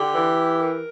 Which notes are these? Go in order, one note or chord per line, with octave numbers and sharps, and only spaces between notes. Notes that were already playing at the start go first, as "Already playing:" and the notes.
Already playing: D3 G4
E3
A#4